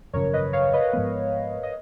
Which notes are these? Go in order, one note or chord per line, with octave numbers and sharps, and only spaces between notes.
G#1 F#2 C#3 F3 A#4 C#5
B4 D#5
C#5 F5
B4 D#5
G#2 F3 G#3 B3
D#5